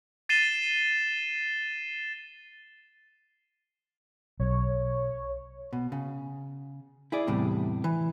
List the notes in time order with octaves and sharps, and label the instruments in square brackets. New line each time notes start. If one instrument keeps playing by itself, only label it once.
[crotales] A6 C7 D#7 E7 G7
[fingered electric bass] B1 [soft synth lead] C#5
[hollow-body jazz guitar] B2
C#3
E4 G#4 D5
E2 A2 C3 G3
E3